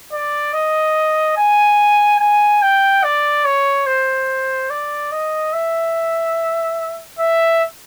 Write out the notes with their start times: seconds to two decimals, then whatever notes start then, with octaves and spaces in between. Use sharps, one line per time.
0.13 D5
0.53 D#5
1.37 G#5
2.20 G#5
2.62 G5
3.04 D5
3.45 C#5
3.87 C5
4.70 D5
5.12 D#5
5.53 E5
7.19 E5